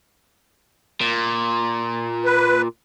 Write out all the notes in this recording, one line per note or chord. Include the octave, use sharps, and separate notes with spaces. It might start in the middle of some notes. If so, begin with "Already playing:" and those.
A#2
B4